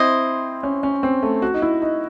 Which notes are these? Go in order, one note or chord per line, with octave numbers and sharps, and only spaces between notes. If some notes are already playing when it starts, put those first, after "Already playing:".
Already playing: C4 E4 C5 D#5
C#4
C#4
C4
A3
F#4
D#4
E4
D#4